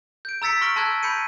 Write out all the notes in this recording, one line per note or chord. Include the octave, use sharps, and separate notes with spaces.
G6 D7
A#5 E6 A6 B6 C#7
C6 C#6 F6 A#6 D7
A5 C6 E6 F#6 G#6
B5 G6 C#7 D#7